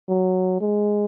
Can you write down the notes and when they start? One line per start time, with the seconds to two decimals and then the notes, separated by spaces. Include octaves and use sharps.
0.09 F#3
0.61 G#3